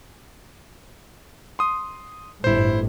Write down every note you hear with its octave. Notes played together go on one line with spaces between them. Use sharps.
C6 D#6
G1 A2 E4 C5